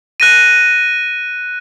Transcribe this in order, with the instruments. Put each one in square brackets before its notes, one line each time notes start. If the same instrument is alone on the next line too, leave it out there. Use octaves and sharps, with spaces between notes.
[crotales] F#6 A#6 D#7